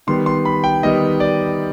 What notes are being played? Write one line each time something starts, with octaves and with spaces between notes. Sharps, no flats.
D#3 G3 B3 C6
C6
B5
G5
D#3 G3 B3 D#5
D5